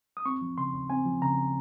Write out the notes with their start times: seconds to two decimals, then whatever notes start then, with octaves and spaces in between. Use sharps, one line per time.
0.17 D#6
0.26 C4 C#6
0.42 F3
0.58 C#3 C6
0.74 D#2
0.90 C4 G#5
1.05 F3
1.22 C#3 A#5